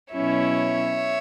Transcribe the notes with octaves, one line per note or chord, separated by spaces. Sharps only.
B2 F#3 C#4 E4 C#5 E5